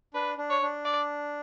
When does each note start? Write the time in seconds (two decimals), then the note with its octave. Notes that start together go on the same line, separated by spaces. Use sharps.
0.14 D4 B4
0.38 D4
0.50 C#5
0.62 D4
0.85 D5